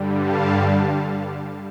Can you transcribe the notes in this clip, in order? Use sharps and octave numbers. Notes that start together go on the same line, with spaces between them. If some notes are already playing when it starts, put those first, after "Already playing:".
Already playing: G2 D3 G3
F5 A5